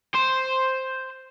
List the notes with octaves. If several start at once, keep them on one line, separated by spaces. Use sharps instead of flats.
C5